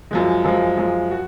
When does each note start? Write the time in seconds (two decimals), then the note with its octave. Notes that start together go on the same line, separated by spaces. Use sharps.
0.11 F#2 F3 G#3
0.44 F#2 F3 G#3
0.77 F#2 F3 G#3
1.11 F#4